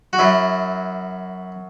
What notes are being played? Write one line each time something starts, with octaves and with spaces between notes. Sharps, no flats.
F#4
F#2 F#3 E4